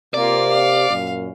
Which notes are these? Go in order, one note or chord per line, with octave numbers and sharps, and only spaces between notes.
C3 A#3 F4 D5
F5
F#2 A#2